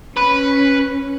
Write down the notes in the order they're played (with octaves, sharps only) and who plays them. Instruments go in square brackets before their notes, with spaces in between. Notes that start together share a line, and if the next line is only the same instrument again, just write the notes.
[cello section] C#4 [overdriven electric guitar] B4